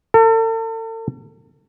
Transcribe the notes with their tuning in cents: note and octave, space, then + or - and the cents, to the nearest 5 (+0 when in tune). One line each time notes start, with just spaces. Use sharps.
A4 +40